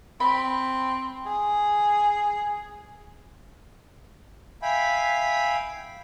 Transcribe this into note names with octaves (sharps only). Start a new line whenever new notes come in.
C4 B5
G#4
E5 F5 G5 G#5 B5